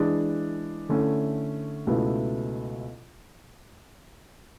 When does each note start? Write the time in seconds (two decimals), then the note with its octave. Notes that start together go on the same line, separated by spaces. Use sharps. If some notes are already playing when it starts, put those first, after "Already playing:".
Already playing: E3 G#3 D4 G#4
0.89 D3 A3 C#4 E4
1.87 C#2 B2 A3 E4 B4